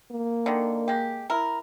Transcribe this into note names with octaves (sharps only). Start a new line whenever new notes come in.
A#3
D3 D#3
G#3 G4
E4 A#4